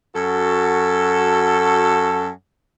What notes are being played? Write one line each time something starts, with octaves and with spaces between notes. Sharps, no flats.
F#2 F#4 A4